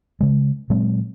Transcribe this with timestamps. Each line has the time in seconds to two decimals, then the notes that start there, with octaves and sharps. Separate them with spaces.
0.21 C#3 G#3
0.70 A#2 F#3 G#3 C4